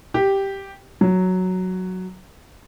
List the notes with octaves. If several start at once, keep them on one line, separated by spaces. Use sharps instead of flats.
G4
F#3